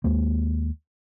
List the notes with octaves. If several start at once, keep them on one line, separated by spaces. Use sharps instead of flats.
D#2 G#3 A#3